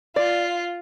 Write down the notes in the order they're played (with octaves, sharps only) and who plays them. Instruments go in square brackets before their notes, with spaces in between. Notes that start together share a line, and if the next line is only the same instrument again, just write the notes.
[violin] F4 [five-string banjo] D5